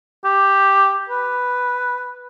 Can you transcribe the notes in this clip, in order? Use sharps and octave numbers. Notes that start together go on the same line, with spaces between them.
G4
B4